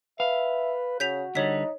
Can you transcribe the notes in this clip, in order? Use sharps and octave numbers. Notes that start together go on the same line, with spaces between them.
B4 E5 F5
C#3 F#4 G6 B6 F7
D3 G3 D#4 C#5 B6